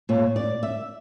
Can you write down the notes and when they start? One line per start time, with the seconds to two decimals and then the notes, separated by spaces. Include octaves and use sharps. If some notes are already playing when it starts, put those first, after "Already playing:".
0.09 A#2 C#5
0.36 D5
0.63 E5